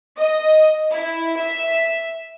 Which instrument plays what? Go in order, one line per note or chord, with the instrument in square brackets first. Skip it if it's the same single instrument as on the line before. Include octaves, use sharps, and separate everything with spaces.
[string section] D#5
E4
E5